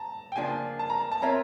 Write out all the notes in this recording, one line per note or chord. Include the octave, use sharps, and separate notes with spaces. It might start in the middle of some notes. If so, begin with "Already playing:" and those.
Already playing: A5 A#5
G5
C#3 F3 A#3 D4 F4 G#5
A5
A#5
A5
C4 F4 A#4 C#5 E5 A#5